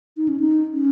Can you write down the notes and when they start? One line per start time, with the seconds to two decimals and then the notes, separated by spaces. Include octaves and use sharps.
0.17 D#4
0.28 C#4
0.40 D#4
0.74 C#4